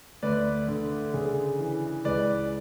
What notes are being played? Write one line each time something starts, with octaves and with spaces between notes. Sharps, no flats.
D2 B4 D5
D3
C#3
E3
C#2 B4 D5